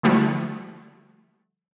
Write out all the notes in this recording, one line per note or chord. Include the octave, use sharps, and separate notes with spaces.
D3 F3 G3 A3 E4 F#4